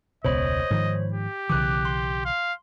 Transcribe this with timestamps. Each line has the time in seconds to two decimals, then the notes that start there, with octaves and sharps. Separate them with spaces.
0.25 E1 C#2 B2 C5 C#5 D#5 B5
0.71 G#2 D#3 F3
1.14 G4
1.50 B1 C#3 E3 D6 F#6
1.85 C6
2.25 F5